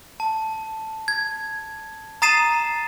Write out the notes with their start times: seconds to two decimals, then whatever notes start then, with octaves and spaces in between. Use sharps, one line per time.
0.20 A5
1.08 G#6
2.22 A#5 D#6 A6 C7 D#7 E7